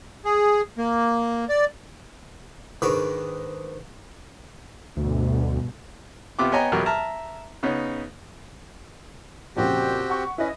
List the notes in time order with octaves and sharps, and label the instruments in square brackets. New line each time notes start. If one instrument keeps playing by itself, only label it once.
[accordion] G#4
A#3
D5
[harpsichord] G#2 D#3 D4 B4 C#6
[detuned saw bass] D2 [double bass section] G2 B2
[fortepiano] C3 B3 F4 G4 D6
B3 C#5 D#5 G5 G#5 A#5
E2 B2 F#3 G4 A#4
E5 A5 A#5 F6
C#3 B3 D#4 C#5
[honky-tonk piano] F2 A#2 C#3 [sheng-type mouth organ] C4 F#4 G4
[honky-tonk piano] F#5 C#6
[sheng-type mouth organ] C#4 B4 [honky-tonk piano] E4 D#5